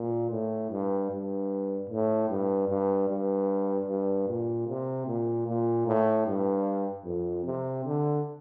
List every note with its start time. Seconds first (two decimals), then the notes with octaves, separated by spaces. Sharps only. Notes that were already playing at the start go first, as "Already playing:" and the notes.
Already playing: A#2
0.30 A2
0.71 G2
1.10 G2
1.90 A2
2.29 G2
2.69 G2
3.09 G2
3.88 G2
4.28 A#2
4.68 C3
5.07 A#2
5.47 A#2
5.87 A2
6.26 G2
7.05 F2
7.46 C3
7.85 D3